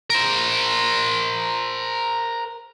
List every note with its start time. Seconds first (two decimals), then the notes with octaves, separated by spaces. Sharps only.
0.10 A#4 C5